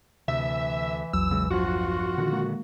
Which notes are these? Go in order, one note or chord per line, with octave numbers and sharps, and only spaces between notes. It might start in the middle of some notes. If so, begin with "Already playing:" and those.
D2 C3 E3 E5
A#1 E2 F#3 E6
C#3 G#3
G2 F3 F4 F#4
A#2 D3 D#3 F3
D#3 G#3 A#3